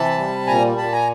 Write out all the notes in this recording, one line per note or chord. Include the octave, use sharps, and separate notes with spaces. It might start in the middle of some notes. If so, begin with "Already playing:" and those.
Already playing: C3 E3 A5 B5
G3
A#2 G#5 A#5
A#2 A5 B5
G#5 A#5